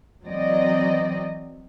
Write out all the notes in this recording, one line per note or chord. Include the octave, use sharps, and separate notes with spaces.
E3 F#3 C4 D5 D#5